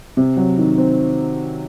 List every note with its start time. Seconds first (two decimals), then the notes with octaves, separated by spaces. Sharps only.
0.17 C3
0.37 F#3
0.58 D#3
0.78 C4